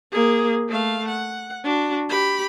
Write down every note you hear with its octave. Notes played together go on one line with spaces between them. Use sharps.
A#3 G#4
A3 F5
F#5
D4 F#4
G4 B5